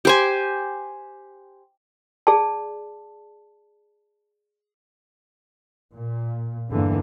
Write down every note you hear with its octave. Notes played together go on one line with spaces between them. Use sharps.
G4 C5 G#5
G#4 D5 A5
A#2
E2 G2 D3 E3 A#3